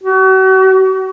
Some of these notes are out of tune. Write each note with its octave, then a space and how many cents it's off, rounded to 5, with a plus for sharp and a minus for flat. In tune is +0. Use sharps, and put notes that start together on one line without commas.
F#4 +40